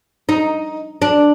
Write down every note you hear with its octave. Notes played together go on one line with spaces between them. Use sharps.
D#4
D4